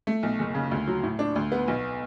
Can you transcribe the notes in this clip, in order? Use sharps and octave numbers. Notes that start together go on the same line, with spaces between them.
A3
B1
F#1
C#3
D2
F#3
A2
D4
D2
B3
B1